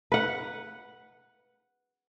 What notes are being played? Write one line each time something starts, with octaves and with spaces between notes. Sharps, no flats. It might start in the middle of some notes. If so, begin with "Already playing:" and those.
B4 F#5